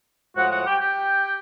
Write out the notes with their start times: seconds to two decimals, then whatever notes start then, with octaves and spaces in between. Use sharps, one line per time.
0.36 A2 F3 G#3 F#4 F#5
0.51 F#4 F#5
0.66 G4 G5
0.81 G4 G5